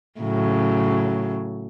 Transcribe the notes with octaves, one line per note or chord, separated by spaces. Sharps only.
A2 C#3 F#3